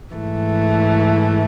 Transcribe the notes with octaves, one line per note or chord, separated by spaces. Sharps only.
G#2 E3 A3